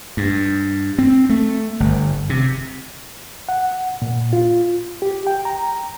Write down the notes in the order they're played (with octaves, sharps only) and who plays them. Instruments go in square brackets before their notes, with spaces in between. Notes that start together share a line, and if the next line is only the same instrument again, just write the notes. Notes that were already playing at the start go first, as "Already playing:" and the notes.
[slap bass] G2
C4
A3
G1
C3
[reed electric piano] F#5
A#2
F4
G4
G5
A#5